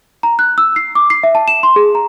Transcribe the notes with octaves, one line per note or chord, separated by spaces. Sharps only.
A#5
F#6
E6
C7
D6
C7
E5
A5
E7
C6
G#4
A#5